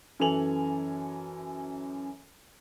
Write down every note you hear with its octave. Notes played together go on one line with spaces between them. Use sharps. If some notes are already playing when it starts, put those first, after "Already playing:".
F#2 E3 A4 G#5 F7 F#7